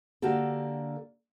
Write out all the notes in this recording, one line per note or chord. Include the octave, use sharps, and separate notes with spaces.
D3 A#3 F#4 G4 A4